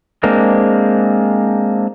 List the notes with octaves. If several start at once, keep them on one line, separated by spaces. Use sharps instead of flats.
G#3 A#3 C4 D4 A#4